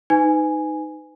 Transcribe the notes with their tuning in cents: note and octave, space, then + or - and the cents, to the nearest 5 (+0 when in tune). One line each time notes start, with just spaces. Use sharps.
D#4 +0 B4 +35 G#5 +0